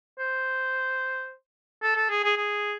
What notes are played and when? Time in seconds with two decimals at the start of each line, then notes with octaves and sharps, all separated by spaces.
0.19 C5
1.83 A4
1.96 A4
2.10 G#4
2.24 G#4
2.37 G#4